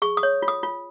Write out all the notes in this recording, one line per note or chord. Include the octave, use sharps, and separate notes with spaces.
G#4 C#6
D#6
C#5
F4
D#6
F4